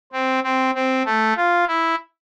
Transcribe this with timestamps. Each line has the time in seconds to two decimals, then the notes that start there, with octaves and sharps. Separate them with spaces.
0.13 C4
0.44 C4
0.75 C4
1.05 A3
1.36 F4
1.67 E4